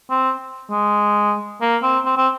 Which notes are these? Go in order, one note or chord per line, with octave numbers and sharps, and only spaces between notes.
C4
G#3
A#3
C4
C4
C4